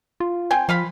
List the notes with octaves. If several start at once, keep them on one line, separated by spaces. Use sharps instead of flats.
F4
C4 G5 G#5
F3 F4 F5 B5